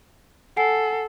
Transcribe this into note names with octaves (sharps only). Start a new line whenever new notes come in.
A4 F#5 G#5 C7